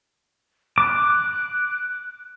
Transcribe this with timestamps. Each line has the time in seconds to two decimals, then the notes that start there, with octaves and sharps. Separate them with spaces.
0.78 D6 F#6